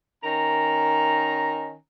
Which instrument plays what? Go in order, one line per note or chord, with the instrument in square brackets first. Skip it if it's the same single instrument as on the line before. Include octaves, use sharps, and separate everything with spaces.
[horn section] D#3 C#4 A#5